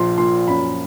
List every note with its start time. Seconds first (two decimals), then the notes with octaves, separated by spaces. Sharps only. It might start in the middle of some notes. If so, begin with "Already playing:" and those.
Already playing: A#1 F3 C6
0.18 A#2 C6
0.48 F#2 B5